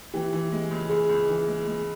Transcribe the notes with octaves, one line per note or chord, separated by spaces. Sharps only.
E3 G4
E3
G#3
C#2
C#2 G#4
C#2
E3
G#3
G#3